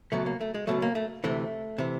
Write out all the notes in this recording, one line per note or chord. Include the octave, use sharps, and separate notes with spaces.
C#2 B2 F#3 A3
A#3
A3
G#3
C#2 B2 F#3 A3
A#3
A3
D2 C3 E3 A3
C3 E3